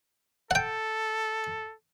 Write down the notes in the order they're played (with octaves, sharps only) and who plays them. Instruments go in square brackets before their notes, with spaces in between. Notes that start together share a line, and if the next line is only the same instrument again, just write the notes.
[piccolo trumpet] A4 [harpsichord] F#5 G5